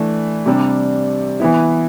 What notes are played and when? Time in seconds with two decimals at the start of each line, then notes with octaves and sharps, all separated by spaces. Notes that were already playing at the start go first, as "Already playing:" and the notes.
Already playing: E3 A3 D4
0.46 C3 G3 D4
1.40 E3 B3 E4